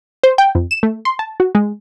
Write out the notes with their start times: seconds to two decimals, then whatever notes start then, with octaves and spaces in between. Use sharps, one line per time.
0.23 C5
0.38 G5
0.55 F2
0.71 E7
0.83 A3
1.05 C6
1.19 A5
1.40 F#4
1.55 G#3